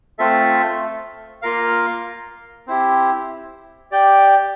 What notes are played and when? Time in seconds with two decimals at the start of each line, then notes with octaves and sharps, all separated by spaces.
0.19 A3 C4 F4 A4 E5
1.42 A#3 F4 A#4 F5
2.68 C4 E4 G4
3.91 G4 D5 G5